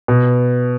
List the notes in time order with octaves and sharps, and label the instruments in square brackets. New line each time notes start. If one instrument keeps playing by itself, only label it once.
[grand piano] B2